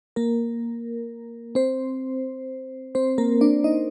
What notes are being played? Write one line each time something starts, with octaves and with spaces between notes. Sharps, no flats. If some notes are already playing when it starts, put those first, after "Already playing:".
A#3 A#4
C4 C5
C4 C5
A#3 A#4
D4 D5
D#4 D#5